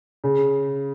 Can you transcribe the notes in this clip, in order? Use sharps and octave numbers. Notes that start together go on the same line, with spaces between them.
C#3